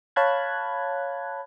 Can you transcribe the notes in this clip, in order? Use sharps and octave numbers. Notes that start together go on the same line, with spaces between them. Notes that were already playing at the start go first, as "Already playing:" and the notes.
C#5 F5 A5 B5 F#6 G#6